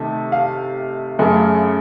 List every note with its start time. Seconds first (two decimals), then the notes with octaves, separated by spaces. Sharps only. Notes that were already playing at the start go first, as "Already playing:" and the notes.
Already playing: C3 D#3 A3 A5
0.32 F5
1.19 F#2 C#3 A3